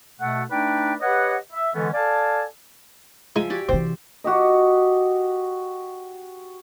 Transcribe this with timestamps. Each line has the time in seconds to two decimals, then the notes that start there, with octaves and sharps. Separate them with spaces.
0.21 B2 A3 F#5
0.51 A3 D4 D#4 B4 D5 G5
1.02 G4 B4 C#5 D#5 F#5
1.53 E5
1.75 D3 E3 G#3 B3 C#4 A4
1.94 A4 D5 F5 G#5 A5
3.36 F3 G#3 E5 G#5 A#5
3.50 F#4 G4 D5
3.69 C3 E3 C4 C5
4.24 F#4 G4 D#5